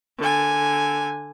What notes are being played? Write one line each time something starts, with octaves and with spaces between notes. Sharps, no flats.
D3 G#5